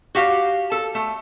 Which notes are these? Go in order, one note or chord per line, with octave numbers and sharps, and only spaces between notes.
F#4 G4 F5
A4
A3